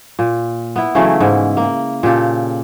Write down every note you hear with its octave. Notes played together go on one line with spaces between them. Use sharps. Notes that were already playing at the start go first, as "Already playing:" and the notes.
A#2
B3 E4
C#3 E3 F#3 A3
G#2 E4
A#3
A#2 C#3 G4 A4